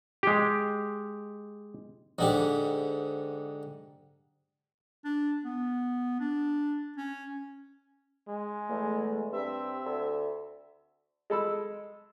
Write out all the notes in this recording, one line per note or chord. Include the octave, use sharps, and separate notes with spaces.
G#3 G4
G#2 D3 G4
D4
B3
D4
C#4
G#3
E2 A3
G2 C4 E5
D2
G#3 A4 B5 E6